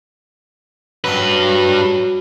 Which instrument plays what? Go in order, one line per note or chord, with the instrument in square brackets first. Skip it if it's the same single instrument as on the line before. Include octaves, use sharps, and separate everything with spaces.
[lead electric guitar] G2 B4 [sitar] F#3